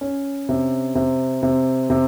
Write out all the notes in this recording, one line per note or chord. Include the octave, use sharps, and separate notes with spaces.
C#4
C3
C3
C3
C3